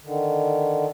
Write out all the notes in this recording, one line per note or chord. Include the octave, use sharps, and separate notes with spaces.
D3 D#3